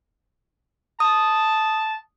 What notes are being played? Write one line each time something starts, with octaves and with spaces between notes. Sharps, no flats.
A5 D#6